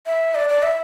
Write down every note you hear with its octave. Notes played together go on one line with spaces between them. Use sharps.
E5
D5
D5
E5